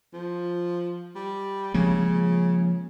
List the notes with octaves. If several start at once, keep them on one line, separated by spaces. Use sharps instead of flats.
F3
G3
C#3 F3 G#3 A#3